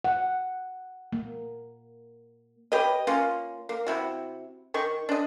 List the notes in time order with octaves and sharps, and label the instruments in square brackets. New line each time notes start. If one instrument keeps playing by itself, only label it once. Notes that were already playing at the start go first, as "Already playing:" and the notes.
[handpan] F#5
A#3
[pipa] G4 B4 C#5 D#5
A#3 C#4 F4
A#3
C3 E4 F#4
D#3 C#6
D4 D#5